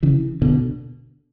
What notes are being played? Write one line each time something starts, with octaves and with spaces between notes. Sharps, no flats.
C#3 E3
B2 D3